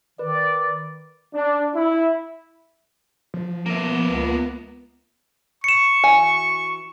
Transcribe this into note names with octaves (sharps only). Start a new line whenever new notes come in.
D#3 B4 D5
D4
E4
F3
A#3 B3 E5
C#2
C#6 C#7 E7
E3 F#4 G#5